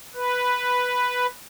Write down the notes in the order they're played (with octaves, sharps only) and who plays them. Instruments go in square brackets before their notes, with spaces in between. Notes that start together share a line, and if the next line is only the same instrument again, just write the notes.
[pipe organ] B4